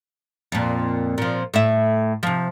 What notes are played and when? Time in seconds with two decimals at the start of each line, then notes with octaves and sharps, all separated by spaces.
0.52 F2 A#2
1.18 A#2 F3
1.54 A2 E5
2.23 C3 F3